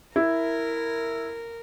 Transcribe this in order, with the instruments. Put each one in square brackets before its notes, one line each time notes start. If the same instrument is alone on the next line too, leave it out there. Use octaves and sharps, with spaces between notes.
[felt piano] E4 [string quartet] A#4